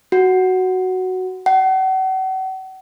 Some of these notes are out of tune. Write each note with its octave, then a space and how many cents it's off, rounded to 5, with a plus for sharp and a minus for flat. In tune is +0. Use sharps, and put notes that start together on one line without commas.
F#4 +5
F#5 +40